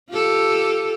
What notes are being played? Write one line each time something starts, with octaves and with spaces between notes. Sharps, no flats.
F4 G4 A4